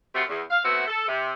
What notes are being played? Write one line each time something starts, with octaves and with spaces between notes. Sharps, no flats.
F#2 C3 A3 F4 F#4
E2
F5
A3 B3 C4 E4 F#4
A4
C3